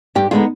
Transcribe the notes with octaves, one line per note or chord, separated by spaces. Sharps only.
G2 G4
D3 G#3 B3 D#4 F4